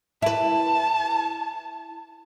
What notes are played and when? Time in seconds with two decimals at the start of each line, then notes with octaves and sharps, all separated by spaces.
0.22 E4 B4 A5